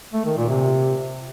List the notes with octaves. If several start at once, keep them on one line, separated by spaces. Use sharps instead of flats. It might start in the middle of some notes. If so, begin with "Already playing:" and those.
A3
D#3
A#2
C3